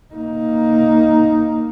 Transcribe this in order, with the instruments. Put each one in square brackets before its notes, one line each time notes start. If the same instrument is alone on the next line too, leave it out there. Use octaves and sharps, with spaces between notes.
[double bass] A#3 D#4